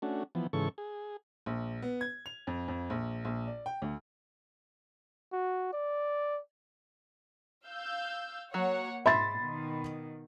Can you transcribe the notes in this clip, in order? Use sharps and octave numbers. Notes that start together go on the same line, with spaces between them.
A3 C#4 D4 F#4
E3 F3 B3
G#2 C#3 E3 A4 C#6
G#4
A#1
B3
G#6
F7
F2
F2
A#1
A#1
D5
G5
D2
F#4
D5
F5 E6 G6
F#3 A#3 C#5 F#5
G#2 E5 B5 C6 A6
B2 D#3